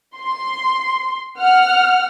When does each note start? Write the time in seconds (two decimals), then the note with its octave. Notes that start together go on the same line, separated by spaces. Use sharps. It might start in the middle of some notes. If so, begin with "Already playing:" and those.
0.15 C6
1.41 F#5 F6